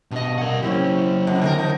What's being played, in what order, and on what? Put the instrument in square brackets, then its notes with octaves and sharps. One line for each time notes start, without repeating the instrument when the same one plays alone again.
[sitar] G2 D#5 [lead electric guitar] B2
[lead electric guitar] A#4 F#5
[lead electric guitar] F#3 A#3 [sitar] C4 [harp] C#4 E4 G4
[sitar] F2
D3 G#4 A#4
E3 F3 D#4